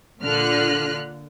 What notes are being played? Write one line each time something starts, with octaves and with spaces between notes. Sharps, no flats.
A#2 D3 F4 F6 F#6